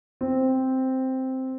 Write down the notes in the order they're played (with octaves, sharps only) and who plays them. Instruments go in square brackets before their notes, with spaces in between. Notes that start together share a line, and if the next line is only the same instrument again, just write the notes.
[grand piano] C4